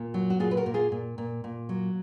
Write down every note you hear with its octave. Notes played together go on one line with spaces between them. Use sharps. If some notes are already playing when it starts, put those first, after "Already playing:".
Already playing: A#2
F#3
F#4
A#2 F4 G#4
B4
F#4 A#4
A#2
F4 G#4
A#2
A#2
A#2
F#3